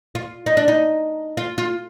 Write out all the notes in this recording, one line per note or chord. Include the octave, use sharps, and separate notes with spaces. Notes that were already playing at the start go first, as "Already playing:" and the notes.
F4
D#4
D4
D#4
F4
F4